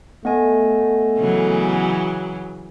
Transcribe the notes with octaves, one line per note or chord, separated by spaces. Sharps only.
A3 B3 D#5 G#5
C#3 E3 F#3